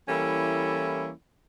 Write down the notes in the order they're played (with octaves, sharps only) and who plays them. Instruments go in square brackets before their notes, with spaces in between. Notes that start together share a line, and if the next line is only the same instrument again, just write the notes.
[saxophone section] E3 G3 A#3 C#4 E4 A4